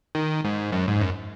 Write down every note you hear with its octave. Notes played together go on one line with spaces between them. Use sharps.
D#3
G#2
F#2
G#2
F#2